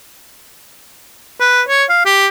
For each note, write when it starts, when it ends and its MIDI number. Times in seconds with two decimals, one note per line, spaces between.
1.40 1.62 71
1.68 1.84 73
1.89 2.02 77
2.05 2.27 67